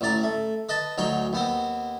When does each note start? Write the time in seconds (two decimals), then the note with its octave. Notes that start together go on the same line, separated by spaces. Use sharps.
0.01 A1 A2 D5 A#5
0.23 A3
0.69 B4 D#5 A5
0.98 D2 F#3 D#4 G5
1.33 D#2 B3 C4